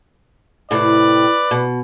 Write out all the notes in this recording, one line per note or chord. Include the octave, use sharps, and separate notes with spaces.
A2 C3 C4 B4 D5
B2